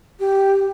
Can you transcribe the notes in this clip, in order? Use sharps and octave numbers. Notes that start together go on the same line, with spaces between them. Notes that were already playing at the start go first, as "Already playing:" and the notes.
G4